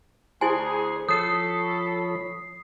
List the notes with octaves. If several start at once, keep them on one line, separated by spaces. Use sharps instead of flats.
D2 E4 G#4 C5 G#5 C6
F3 A4 C#5 B5 D#6 C7